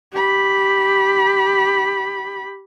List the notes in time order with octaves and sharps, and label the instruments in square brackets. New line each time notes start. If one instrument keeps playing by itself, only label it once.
[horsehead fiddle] G4 B5